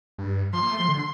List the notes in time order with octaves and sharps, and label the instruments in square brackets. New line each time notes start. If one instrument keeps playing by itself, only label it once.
[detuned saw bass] G2
[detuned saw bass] F3 [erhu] C6
[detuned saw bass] A#3
A3
F3
D3